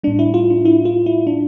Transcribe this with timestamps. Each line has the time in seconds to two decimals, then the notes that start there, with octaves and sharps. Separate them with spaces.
0.03 A2 G3 D4
0.19 E4
0.34 F4
0.50 D4
0.65 E4
0.85 F4
1.06 E4
1.27 D4